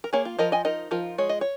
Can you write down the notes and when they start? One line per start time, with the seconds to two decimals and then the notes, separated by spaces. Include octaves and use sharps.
0.04 A#4
0.13 A#3 G#4 C#5
0.25 F4
0.39 F3 A#4 D#5
0.52 D#5 G#5
0.65 D#4 A#4 D#5
0.91 F3 F4 A#4
1.18 G#3 C#5
1.29 D#5
1.41 C#5